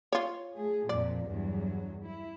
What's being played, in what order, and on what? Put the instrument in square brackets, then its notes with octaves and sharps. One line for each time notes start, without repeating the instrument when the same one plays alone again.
[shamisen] F4 C#5
[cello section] A3 G#4
[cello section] F2 A#2 F3 [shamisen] D5
[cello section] E2 G2 F#3
E4